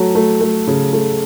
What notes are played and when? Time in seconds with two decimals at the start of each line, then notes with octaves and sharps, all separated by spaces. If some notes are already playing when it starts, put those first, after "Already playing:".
Already playing: F#3 A3
0.15 A3
0.41 A3
0.67 C#3
0.93 A3